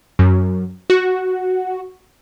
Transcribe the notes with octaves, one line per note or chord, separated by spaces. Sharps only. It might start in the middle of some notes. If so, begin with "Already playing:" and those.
F#2
F#4